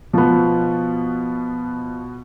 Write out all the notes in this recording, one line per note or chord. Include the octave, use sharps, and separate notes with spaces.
B2 F3 B3